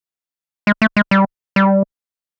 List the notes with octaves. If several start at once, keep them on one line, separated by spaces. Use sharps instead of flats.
G#3
A3
G#3
G3
G3